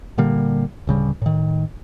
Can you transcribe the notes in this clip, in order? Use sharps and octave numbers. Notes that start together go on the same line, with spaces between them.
A#2 D3 G3 A#3
D1 C#3 G3
A2 D#3